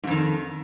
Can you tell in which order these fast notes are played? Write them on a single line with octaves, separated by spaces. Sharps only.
G#2 F2 D#3